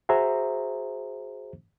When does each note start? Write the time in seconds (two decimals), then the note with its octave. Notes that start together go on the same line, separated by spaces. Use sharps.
0.09 F#4 G#4 C5 E5 A#5